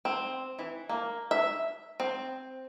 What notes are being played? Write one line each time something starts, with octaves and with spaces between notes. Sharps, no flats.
C4
E3
A#3
E5
C4